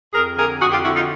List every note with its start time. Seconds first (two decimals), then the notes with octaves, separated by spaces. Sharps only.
0.14 F2 G#4 A#4
0.36 D3 G#4 A#4
0.60 F2 F#4 G#4
0.71 F4 G4
0.83 D3 E4 F#4
0.95 D#4 F4